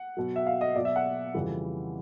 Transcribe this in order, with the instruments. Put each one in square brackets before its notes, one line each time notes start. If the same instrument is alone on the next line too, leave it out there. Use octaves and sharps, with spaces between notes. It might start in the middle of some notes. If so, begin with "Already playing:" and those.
Already playing: [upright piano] F#5
B2 F#3
E5
F5
D#5
B2 F#3 D5
E5
F#5
F2 C#3 E3 G3